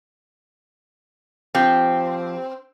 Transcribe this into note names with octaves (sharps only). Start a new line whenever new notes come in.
F3 C4 G4 F5